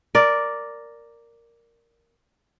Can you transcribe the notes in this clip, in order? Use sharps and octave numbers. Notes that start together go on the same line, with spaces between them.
A#4 D5